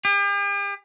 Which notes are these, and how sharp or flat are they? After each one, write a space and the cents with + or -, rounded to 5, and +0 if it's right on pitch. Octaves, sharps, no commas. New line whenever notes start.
G4 +45